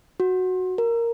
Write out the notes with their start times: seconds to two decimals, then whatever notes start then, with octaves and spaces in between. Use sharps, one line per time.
0.20 F#4
0.78 A#4